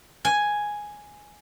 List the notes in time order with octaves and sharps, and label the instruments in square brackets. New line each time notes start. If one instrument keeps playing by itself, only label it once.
[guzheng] G#5